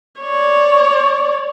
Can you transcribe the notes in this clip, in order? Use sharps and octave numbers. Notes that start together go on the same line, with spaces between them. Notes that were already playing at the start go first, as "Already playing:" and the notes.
C#5 D5